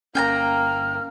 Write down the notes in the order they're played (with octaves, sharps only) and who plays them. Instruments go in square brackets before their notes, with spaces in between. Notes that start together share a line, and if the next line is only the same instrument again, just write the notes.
[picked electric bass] G1 C#4 [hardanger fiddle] A#3 [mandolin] G5 G#5 A#5 [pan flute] F6